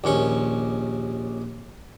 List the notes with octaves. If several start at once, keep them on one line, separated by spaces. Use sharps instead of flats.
A#1 D#2 C#4 C#6